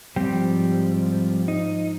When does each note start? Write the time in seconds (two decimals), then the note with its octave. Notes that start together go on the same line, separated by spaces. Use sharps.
0.16 G#2 F3 G3 C4 G4
1.48 D#4